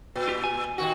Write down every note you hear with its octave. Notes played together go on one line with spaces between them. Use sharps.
A#2
F4 G4
G#5
A#2 D#3 F#4